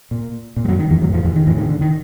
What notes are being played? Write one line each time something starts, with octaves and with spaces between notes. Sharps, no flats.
A#2
A#2
G3
F#2 F#3
D#3
E2 E3
F#2 A2 F#3
F2 F3
E2 E3
D#3
E2 A2 E3
D#3
D3
D#3